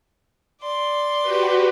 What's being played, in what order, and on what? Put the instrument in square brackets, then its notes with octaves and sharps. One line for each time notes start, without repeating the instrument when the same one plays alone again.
[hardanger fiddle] D5 C6
[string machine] F#4 G4 B4